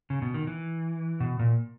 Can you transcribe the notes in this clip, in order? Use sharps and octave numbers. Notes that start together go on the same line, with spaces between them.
C#3
B2
D#3
E3
B2
A#2